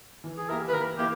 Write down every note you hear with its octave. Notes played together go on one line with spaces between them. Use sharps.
E3
G#4
A#3 E4 G4 A#4
B4
E3 A#4
A#3 E4 G4